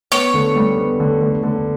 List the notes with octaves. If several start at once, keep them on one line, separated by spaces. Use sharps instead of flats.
B3 C#5
D3
G3
B3
D3
D3
D3